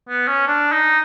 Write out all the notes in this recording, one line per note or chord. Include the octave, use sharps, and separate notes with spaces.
B3
C#4
D4
D#4